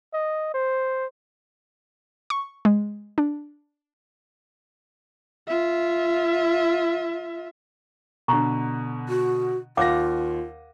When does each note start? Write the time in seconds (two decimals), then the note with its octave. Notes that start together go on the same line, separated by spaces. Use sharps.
0.14 D#5
0.54 C5
2.30 C#6
2.65 G#3
3.18 D4
5.47 F4 E5
8.28 B2 D3 A#5 C#6
9.09 F#4
9.77 D#2 F4 F5 F#5 D6 A#6